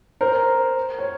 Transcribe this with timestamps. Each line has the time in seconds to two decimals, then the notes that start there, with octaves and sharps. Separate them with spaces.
0.21 A#4 C5
0.99 C#5